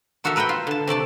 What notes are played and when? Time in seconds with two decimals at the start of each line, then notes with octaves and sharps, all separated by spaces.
0.24 A#3 F#4 A4 A#4 E5
0.36 A#4 B4 E5 F#5 G5
0.49 F4
0.67 D3 A5
0.87 C3 A3 D5 A5